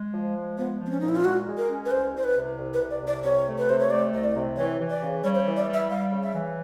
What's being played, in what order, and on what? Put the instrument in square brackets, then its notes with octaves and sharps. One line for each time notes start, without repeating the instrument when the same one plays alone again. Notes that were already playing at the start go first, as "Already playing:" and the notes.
Already playing: [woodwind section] G#3
F3
G#3
[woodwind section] F3 [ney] B3
[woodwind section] F3
[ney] C4
C#4
[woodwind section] A#2 [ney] D#4
[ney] E4
F4
[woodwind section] G#3 [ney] F#4
[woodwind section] G#3
[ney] A#4
[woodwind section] C#4
[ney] B4
[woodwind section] C2 [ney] C5
[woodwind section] C2 [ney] C5
[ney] B4
[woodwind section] C3
C2
[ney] B4
[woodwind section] C3
[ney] D5
[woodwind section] C2
[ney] D5
[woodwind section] C3 [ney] C#5
[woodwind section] A3
[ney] B4
[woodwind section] C3 [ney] C5
[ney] C#5
[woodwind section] A3 [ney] D5
[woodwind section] C2 [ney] D#5
[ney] D5
[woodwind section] C3
[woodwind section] E3 [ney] C#5
[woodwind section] E3
[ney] D5
[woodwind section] C#3
[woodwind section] G3 [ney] C#5
[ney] C5
C#5
[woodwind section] E3
[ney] D5
[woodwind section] G3
[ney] E5
[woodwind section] G3 [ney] F5
[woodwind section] C#3
[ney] E5
[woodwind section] E3